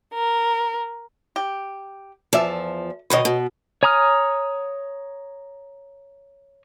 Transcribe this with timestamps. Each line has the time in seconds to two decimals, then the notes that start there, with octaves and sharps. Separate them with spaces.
0.12 A#4
1.36 G4
2.33 E2 F3 A4 D5 E5
3.10 D2 B2 D#3 B4 C#5 D#5
3.25 B2
3.83 C#5 G#5 A#5 D#6 F6